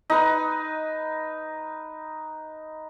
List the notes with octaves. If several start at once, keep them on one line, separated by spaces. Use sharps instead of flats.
D#4 B4